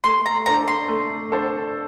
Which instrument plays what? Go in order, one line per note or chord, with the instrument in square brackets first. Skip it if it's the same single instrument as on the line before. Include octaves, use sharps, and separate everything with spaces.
[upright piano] A3 [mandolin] C6
[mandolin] A#5
[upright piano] D4 A4 C5 [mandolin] A#5
[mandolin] C6
[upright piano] A3
D4 A4 C5